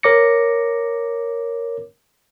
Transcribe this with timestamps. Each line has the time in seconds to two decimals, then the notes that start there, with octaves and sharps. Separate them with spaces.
0.03 A#4 C#5 D6 A#6 C#7